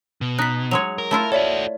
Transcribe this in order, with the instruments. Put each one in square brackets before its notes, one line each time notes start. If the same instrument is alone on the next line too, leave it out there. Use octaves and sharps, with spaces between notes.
[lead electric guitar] B2
[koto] D#4 [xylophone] F#6 B6
[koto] F#3 G#3 C#5 [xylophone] F7
[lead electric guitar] A#4
[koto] A3 E4 F4
[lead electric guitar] F#4 A4 [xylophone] C#5 D5 E5